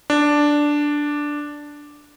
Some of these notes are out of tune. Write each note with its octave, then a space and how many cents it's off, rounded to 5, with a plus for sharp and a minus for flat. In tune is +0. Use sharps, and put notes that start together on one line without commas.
D4 +0